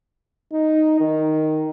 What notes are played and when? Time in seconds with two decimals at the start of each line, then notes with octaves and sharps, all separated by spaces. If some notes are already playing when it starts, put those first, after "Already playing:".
0.53 D#4
1.00 D#3